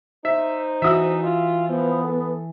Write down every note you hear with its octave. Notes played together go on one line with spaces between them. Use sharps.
D#4 C5 E5
E3 F#4 E5 D#6 E6
F4
F3 B3
A4